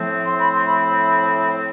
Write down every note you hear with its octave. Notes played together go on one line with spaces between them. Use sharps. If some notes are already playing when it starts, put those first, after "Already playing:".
Already playing: A2 F3 A3 C4
C6
B5
C6
B5